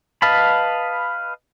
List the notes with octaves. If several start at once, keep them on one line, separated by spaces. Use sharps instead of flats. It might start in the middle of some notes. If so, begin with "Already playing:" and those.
B4 D#5 F5 A5 B5